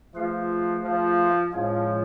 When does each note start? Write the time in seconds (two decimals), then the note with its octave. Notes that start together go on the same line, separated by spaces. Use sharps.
0.14 F3 A3 F4 G#4 B4 F5
0.84 F3
1.52 A2 F3 G#3 C#4 G#4 C#5